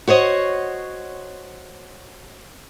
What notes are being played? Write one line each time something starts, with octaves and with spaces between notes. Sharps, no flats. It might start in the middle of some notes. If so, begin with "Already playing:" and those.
F#4 C5 C#5 D#5